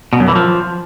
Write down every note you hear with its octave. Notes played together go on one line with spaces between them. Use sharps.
B2
F#2
E3
F3